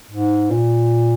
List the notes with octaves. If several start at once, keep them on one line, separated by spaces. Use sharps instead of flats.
G#2
A#2